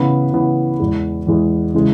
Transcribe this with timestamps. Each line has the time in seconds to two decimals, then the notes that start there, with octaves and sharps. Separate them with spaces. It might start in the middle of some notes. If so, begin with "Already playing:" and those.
Already playing: C#3 E3 B3
0.33 C#3 E3 B3
0.79 E2 E3 G#3
1.27 E2 E3 G#3
1.74 C#3 E3 G#3